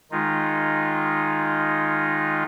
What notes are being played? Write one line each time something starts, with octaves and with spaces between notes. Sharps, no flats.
D#3 G#3 D#4 F4